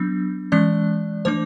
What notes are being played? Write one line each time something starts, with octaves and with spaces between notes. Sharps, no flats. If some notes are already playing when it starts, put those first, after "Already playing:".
Already playing: F#3 B3 D4
E3 G#3 C#4 D5
E3 A3 D4 C5